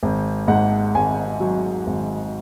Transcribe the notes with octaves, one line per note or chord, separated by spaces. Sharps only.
G#1
G#2 F#5
G#1 G#5
F#3
G#1